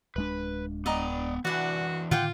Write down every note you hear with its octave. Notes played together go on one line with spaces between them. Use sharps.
D1 G#3 D4 B4
B3 D5 D#5 G5 A#5
E3 D4 F#4 D5 F#5
A2 D3 D#3 F4 F#5 G5 D6